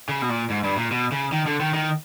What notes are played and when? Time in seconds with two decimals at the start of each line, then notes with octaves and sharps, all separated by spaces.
0.09 C#3
0.22 B2
0.29 A#2
0.50 G#2
0.64 G2
0.77 A#2
0.91 B2
1.12 C#3
1.32 D#3
1.46 D3
1.60 D#3
1.74 D#3